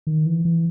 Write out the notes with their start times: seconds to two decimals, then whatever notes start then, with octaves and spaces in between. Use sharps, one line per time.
0.07 D#3
0.26 E3
0.45 E3